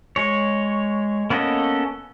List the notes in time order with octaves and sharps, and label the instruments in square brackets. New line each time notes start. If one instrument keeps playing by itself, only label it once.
[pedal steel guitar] G#3 C#5
A#3 B3 C#4 A4 D#5